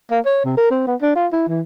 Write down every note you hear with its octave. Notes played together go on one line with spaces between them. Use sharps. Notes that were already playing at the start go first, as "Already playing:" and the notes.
A#3
C#5
C3
A#4
C4
B3
D4
F4
E4
E3